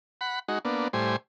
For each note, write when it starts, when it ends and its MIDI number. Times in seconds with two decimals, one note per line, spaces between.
0.21 0.39 78
0.21 0.39 83
0.48 0.59 56
0.48 0.59 63
0.48 0.59 66
0.65 0.88 58
0.65 0.88 59
0.65 0.88 62
0.93 1.16 45
0.93 1.16 55
0.93 1.16 72
0.93 1.16 80